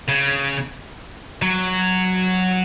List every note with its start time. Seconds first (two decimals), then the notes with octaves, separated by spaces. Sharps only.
0.09 C#3
1.42 F#3